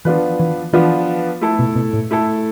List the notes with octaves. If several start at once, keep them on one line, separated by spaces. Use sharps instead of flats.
E3 F3 B3 D4 F4 B4
E3
E3 F3 B3 D4 F4 B4
A3 E4 A4
B2
B2
A2
A3 E4 A4